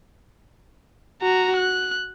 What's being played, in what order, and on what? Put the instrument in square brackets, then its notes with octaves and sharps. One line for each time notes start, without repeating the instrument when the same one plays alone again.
[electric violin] F#4 A#5
F#6